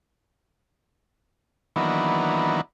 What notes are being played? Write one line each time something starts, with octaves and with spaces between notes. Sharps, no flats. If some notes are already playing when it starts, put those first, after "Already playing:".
D#3 E3 F#3 A#3 B3 D4